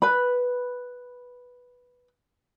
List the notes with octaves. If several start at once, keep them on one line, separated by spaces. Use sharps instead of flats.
B4 B5